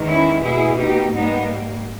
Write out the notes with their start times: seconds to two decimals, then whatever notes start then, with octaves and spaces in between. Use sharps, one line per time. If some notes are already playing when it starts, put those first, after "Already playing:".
Already playing: E2 D#3 G#3
0.08 C#4 E4
0.43 B2 A#3 E4 G#4
0.77 D#4 G4
1.12 G#2 G3 A#3 B3 D#4